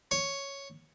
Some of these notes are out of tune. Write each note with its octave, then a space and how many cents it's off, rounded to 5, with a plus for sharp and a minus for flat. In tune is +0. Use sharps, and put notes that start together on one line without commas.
C#5 +0